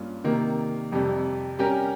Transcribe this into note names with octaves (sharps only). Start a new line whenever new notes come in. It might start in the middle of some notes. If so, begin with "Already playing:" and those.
Already playing: G2 A#3 C#4 F4
C3 D#3 A#3
F2 C3 G3
G3 C#4 G4 A#4